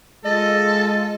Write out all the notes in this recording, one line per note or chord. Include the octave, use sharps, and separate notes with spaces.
G#3 F4 A4 D#5